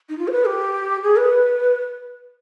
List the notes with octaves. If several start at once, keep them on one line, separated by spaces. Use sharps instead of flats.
D#4
F4
C5
B4
G4
G#4
B4